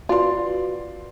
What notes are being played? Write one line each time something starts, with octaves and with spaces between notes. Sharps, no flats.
F4 F#4 B4 D5 C6